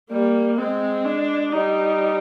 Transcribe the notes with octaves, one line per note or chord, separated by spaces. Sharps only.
G3 A#3
G#3 C4
D4
G3 D#4